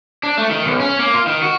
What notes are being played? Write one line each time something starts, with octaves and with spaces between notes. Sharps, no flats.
D4
A3
D#3
B1
C#4
A#3
F4
D#3
F#4